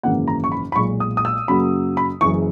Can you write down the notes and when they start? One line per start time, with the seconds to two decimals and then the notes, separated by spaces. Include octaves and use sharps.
0.03 G#1 F#2 C#3 E3 A#3 F#5
0.28 A#5
0.44 C#6
0.52 B5
0.72 B5
0.76 B1 A#2 G#3 C#6
1.00 D#6
1.17 D#6
1.25 E6
1.48 F#2 C#3 F#3 A#3 B5
1.97 B5
2.21 F#1 F#2 C#3 E3 C#6